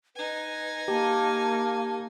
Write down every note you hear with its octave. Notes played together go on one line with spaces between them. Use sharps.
D#4 B4 G#5
A#3 G4 A5